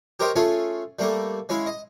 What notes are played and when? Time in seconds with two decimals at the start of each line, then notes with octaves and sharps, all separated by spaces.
0.20 G4 A#4 C5 C#5 D#5 G5
0.36 A3 C#4 F4 G#4 A4
0.99 G3 A3 A#3 A4
1.49 G#3 C#4 E4 F5
1.66 D#5